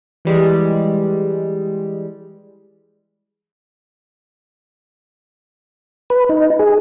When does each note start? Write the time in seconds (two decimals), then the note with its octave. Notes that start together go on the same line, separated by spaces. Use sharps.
0.25 E3 G3 G#3
6.10 B4
6.29 D#4
6.59 G#4